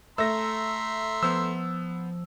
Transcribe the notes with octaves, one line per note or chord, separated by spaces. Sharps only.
A3 E5 A#5 C6 E6 A#6
F3 B3 C5 E6